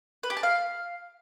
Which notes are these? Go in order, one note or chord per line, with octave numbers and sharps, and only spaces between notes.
B4
G4
A5
F5